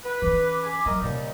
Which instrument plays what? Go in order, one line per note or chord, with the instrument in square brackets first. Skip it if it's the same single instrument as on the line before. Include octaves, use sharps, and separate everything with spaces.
[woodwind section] B4
[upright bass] E3 C#4 [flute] D6
[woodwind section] G#5 B5
[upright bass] F#3 [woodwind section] A#4 D#5 E5
[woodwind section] D#2 G3 D#4 [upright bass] A#2 C#3